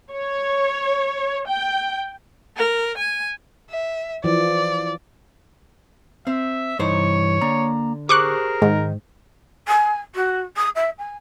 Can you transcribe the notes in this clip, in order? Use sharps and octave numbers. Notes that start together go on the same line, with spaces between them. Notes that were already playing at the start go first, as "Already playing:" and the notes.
C#5
G5
A#4
G#5
E5
E3 F3 D5
C4 E5
C2 G2 E3 D#4 C5 C#5
D3 A#3 A#5
G4 G#4 A#4 C5 C#6 D6 F#6
G#2 D#3
G#5
F#4
D#6
E5
G#5